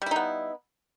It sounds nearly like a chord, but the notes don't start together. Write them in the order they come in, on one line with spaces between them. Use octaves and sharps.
G3 E4 D#4 B3